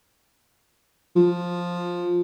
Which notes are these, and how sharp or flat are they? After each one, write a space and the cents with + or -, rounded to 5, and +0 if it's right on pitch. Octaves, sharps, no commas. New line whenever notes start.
F3 +10